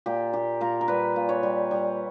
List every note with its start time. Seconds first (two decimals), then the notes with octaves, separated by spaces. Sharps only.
0.06 A#2 G4
0.33 A#2 G4
0.61 A#2 A#4
0.81 A#4
0.88 G3 B4
1.16 A#2
1.29 C#5
1.43 G3
1.71 G3